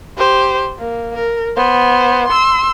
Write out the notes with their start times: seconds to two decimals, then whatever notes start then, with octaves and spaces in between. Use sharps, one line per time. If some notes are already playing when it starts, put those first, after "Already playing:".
0.18 G4 C5
0.78 A#3
1.15 A#4
1.56 B3 C5
2.28 C6 E6